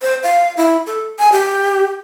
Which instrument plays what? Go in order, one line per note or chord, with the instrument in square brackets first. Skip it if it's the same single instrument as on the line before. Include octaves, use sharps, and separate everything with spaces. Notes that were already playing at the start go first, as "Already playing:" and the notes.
[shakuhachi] C5
F5
E4
A4
G#5
G4